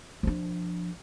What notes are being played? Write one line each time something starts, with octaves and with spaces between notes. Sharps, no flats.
F3 D4